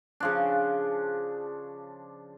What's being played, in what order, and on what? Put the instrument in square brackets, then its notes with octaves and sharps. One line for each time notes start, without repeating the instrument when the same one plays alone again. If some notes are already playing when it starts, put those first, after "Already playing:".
[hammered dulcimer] C#3 F3 D4